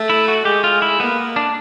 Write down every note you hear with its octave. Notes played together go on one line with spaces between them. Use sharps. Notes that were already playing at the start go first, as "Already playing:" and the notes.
Already playing: A3
E4
F#4
G#3 G4
F4
E4
A#3 B3
D4